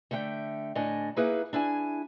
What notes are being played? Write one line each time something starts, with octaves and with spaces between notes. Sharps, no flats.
D3 A3 E5 F5 G5
A2 D3 D4 D#5 G#5
A#3 B3 D#4 E4 G#4 B4
D4 E4 G#4 G#5